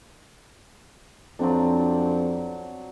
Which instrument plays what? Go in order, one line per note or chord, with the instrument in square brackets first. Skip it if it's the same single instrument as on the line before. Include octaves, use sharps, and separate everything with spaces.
[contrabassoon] F2 [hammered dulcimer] F#3 C4 D4
[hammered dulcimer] C#6